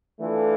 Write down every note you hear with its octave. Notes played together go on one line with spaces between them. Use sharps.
E3 A3 D4 F4 A4